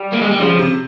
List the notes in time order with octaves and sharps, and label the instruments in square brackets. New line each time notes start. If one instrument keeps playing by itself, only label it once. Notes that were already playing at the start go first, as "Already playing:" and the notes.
Already playing: [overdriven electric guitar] G3
A#3
G#3
G3
[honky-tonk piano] C#3 [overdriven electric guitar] F3
[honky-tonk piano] C3